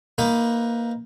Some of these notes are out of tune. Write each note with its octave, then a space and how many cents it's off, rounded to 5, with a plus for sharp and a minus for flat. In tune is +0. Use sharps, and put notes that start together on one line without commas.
A#3 +0 D#4 +20 B4 +15